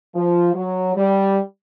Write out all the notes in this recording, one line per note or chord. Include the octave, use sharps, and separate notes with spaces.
F3
F#3
G3